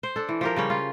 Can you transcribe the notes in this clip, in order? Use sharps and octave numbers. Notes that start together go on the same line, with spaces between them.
C5
D4 A4
E3
F3 G4 A#4
C#3 G3 C#4
F4